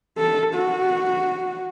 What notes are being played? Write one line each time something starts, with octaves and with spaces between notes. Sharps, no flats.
A4
F#4